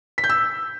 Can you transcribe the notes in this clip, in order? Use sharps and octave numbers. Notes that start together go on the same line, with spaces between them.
B6
G6
E6